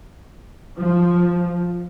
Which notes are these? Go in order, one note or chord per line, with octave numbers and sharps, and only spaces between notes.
F3